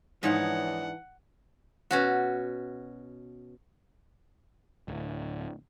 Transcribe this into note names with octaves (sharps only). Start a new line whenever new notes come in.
G#2 E3 F3 D4 D#4 C#5 F#5
B2 C#4 F#4
D1